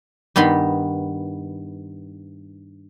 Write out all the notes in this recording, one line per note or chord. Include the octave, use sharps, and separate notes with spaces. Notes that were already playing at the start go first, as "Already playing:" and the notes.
G2 D#3 B3 B5 C6